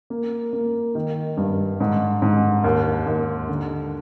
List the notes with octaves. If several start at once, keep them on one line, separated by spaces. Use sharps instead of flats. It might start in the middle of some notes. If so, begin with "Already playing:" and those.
A#3
A#3
D#3
G2
G#2
G#2
D#2
D#2
D3